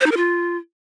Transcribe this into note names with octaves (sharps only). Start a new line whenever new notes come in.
C5
D#4
A#4
F4